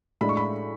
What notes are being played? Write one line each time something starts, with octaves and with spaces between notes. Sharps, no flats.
A2 G#3 D4 B5
C#6
B5